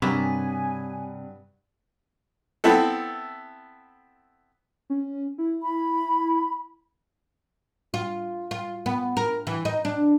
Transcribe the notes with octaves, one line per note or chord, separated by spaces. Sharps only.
G2 C3 F#3 A#3 B3 G#5
B3 C4 E4 A4
C#4
E4
B5
F4
F4
B3
A#4
E3
D#4
D4